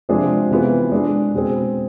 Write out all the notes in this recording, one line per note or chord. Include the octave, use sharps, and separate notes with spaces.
C3 F3 G#3 D4 G#4
C3 E3 B3 F4 G#4
G#3 D4 G#4
B2 G#3 C4 G#4